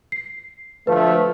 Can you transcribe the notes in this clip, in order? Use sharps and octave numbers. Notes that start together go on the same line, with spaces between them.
C7
D2 F3 A3 B4 F5